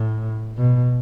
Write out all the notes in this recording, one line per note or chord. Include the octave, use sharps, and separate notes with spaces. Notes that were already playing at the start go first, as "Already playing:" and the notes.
Already playing: A2
B2